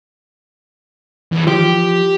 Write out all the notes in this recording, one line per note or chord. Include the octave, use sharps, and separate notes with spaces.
E2
F3 G4